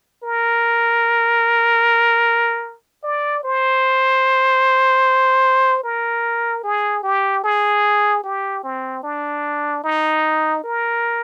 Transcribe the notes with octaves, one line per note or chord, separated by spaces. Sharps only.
A#4
D5
C5
A#4
G#4
G4
G#4
G4
C4
D4
D#4
A#4